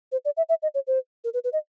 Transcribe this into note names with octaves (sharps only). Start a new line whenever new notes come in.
C5
D5
E5
E5
D#5
C#5
C5
A#4
B4
B4
D#5